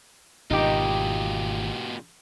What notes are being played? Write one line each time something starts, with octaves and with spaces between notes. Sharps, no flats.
G#1 B2 D#4 F4 G4